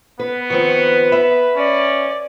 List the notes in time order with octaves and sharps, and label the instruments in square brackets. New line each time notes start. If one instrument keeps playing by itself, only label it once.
[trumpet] B3 [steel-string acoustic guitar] B4
[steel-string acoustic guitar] D#3 F3 C4 [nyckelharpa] B4 [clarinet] C#6
[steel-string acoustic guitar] E5 [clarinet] B5
[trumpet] C#4 [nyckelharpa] D5